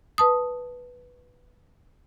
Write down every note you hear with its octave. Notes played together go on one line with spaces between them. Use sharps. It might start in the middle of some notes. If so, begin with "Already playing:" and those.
B4 A5 D#6